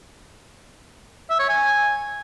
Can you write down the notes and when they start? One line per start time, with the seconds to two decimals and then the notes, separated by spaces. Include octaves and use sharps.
1.30 E5
1.40 C#5
1.49 G#5